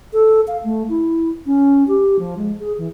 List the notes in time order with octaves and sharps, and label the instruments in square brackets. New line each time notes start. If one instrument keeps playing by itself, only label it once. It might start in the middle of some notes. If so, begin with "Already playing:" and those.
[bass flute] A4
F5
A3
E4
C#4
G4
F3
G#3
G#4
E3